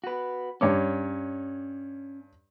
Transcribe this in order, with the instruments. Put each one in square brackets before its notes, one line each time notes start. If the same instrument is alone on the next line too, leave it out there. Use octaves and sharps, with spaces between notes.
[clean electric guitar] F#4 B4
[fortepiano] G2 C#5 D6 [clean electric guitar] C#4